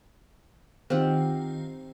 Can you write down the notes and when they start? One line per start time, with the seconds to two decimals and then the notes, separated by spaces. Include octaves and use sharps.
0.90 D#3 C4 F4 G4 F#5